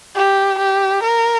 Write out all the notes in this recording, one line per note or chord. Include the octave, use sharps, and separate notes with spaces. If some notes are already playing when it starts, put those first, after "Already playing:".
G4
G4
A#4